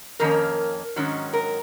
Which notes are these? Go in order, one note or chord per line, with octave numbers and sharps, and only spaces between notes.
F2 D#3 A#3 C#4 A#4
G#2 D#3 F#3 C#4
A#4